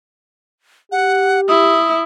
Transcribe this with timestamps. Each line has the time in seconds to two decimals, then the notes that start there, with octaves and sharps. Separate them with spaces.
0.92 G4 F#5
1.48 E4 D#6